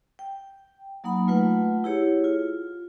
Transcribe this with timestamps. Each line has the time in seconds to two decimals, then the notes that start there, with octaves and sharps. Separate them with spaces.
0.19 G5
1.04 F#3 A#3 D#4 F#5 B5
1.27 A3 F4 B4 F#5
1.84 E4 G4 G#4 C#5
2.24 F4